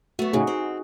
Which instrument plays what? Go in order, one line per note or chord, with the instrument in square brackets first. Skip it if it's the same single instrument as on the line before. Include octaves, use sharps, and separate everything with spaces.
[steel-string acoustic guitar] A3 B3 [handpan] F#4
[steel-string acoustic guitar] A2 C#3 [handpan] D#4 F#4 G#4
[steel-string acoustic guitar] C4